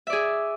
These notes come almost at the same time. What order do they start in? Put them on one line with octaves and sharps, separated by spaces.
E5 D5 G#4